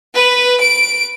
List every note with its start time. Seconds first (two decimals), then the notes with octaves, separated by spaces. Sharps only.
0.16 B4
0.62 D7